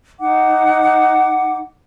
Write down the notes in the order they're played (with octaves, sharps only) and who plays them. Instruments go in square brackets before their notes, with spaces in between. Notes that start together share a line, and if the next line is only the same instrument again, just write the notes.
[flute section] D#4 F#5 D6